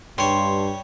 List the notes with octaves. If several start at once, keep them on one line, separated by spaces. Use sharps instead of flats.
G2 G3 C#5 C6